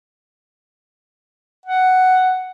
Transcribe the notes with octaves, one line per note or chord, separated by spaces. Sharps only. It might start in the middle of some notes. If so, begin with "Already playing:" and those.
F#5